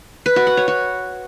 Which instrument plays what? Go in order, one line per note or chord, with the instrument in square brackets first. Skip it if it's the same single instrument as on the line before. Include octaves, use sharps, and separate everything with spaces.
[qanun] B4
F#4
F#5
C#5
F#4